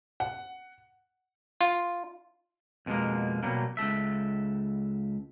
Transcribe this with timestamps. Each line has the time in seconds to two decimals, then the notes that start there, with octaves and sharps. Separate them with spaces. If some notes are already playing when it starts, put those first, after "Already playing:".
0.20 F#5
1.61 F4
2.86 F2 B2 E3 G#3 A#3
3.43 B2 F#3 G3 A#3
3.77 C#2 B2 A4 E5